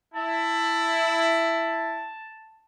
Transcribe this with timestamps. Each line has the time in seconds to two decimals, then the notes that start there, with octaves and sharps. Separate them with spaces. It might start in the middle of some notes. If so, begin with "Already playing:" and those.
0.14 E4 A5